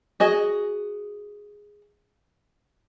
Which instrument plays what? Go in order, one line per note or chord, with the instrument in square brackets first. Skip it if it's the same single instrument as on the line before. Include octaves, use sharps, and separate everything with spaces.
[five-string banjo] F#4 G#4 D#5